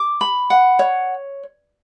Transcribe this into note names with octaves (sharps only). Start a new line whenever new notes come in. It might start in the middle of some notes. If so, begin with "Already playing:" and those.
Already playing: D6
B5
F#5
C#5